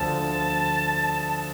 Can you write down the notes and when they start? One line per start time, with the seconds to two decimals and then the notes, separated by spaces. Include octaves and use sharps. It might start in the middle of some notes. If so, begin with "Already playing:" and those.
Already playing: D2 D3 F3 A5